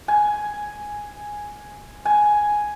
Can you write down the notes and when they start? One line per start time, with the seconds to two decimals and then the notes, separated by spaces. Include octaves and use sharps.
0.08 G#5
2.05 G#5